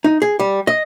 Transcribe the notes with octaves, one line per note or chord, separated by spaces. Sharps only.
D#4
G#4
G3
D#5